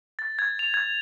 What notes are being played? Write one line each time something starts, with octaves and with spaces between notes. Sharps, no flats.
A6
G#6
F7
G#6